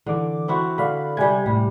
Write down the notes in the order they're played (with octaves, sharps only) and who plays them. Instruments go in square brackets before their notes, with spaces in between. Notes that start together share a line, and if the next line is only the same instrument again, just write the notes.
[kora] D3 [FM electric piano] E3 D6
[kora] C4 E4 F#4
[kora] D3 [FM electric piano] D5 F5 B5
[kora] C3 G3 [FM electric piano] D5 G#5 G#6
[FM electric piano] A2 [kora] G3